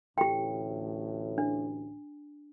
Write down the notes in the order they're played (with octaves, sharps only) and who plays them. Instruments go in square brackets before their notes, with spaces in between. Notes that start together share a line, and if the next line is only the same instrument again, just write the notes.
[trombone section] A1 D2 A2 [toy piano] G4 G5
[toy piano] D4